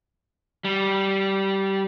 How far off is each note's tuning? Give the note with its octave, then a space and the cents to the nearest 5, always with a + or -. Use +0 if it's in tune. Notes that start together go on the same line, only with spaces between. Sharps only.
G3 -15